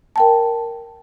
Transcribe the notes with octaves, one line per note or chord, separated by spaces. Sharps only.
A#4 G5 A5